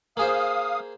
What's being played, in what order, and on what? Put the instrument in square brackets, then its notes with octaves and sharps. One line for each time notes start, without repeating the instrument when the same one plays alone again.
[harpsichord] A#3 G#4 C5 [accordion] F5 D#6